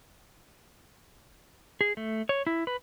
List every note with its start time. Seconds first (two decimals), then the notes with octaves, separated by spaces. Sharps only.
1.81 G#4
1.97 A3
2.29 C#5
2.47 E4
2.67 B4